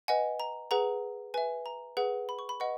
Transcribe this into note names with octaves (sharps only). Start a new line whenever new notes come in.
B4 D#5 F#5 G#5
A#5
G#4 B4 F#5 A#5
B4 E5 G#5
A#5
G#4 B4 F#5
B5
C#6
B5
B4 D#5 F#5 C#6